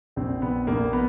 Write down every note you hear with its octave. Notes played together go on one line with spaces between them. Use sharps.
A#1 C4
A#1 B3
A#1 A#3
B3